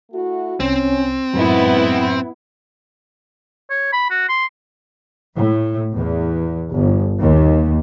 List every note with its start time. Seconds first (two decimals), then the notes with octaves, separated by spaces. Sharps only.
0.12 A3 E4 F#4
0.60 C2 C4 C#4
1.34 F#2 A2 D#3 F#3 G#3 B3 E4
3.70 C#5
3.92 B5
4.10 F#4
4.29 C6
5.37 A2
5.96 E2
6.72 G1
7.19 D#2